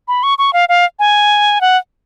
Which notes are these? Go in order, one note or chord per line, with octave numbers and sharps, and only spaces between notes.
B5
C#6
C#6
F5
F5
G#5
F#5